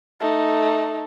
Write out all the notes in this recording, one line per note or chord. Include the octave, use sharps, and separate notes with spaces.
A3 D#4